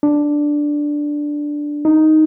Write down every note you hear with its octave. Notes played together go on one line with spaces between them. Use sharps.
D4
D#4